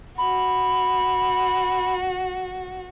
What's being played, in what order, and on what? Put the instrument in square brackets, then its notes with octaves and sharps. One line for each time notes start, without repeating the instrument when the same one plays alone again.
[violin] F#4 [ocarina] B5